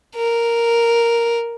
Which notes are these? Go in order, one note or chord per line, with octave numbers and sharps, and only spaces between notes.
A#4